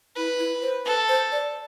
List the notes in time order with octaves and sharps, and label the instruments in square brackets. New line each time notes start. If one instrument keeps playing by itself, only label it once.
[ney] E4 [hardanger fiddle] B4
[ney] E4
C5
[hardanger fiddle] A4 [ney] B4
[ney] C5
D5